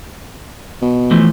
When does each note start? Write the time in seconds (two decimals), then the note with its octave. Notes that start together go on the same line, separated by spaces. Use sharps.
0.82 B2
1.11 E3 F3 A3